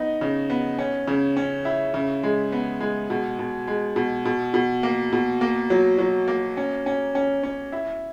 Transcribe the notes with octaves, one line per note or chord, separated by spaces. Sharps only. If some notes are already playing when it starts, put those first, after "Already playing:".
Already playing: B3 D#4
C#3
B3
C#4
C#3
C#4
E4
C#3
G#3
B3
G#3
B2
B2
G#3
B2
B2
B2
A#3
B2
A#3
F#3
F#3
A#3
C#4
C#4
C#4
C#4
E4